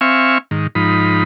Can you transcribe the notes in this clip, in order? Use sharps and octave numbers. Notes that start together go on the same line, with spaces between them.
C4 E5 F5 G#5 C#6
G#2 D#3
G#2 F3 D#4 B5